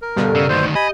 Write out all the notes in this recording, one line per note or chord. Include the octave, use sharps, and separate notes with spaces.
A#4
G2 B2 D3 G4 A4
C#3 D5 E6
D2 D#3 C5
G4 D#5 G#5 B5